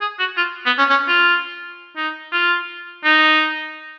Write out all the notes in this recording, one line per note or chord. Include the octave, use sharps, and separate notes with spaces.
G#4
F#4
F4
B3
C#4
C#4
F4
D#4
F4
D#4